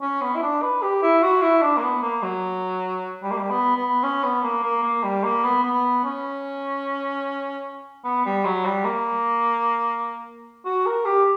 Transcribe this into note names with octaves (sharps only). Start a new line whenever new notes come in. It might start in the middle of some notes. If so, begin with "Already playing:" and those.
C#4
B3
E4
D4
B4
G4
E4
F#4
E4
D4
A#3
B3
A#3
F#3
G3
A#3
G3
B3
B3
C#4
B3
A#3
A#3
A#3
G3
A#3
B3
B3
C#4
B3
G3
F#3
G3
A#3
F#4
A#4
G4